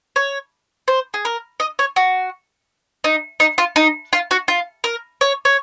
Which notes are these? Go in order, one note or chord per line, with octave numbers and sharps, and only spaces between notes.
C#5
C5
G#4
A#4
D#5
C#5
F#4
D#4
D#4
F4
D#4
F4
F#4
F4
A#4
C#5
C#5